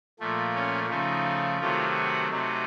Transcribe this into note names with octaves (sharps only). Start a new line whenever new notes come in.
A#2 F3 A3
C#4
C#3 F3 A3 D#4
C3 D#3 F#3 A3 F4
F#4
C3 F#3 A3 D#4